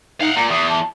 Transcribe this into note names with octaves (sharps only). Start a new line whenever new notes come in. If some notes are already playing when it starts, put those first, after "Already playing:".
D#4 F5 F#5
A#2 A#5
E2 D#6
A5